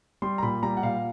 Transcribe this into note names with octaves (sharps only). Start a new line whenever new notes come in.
G3 C6
A#5
A#2 B5
G3 A#5
F#5
A#2 F5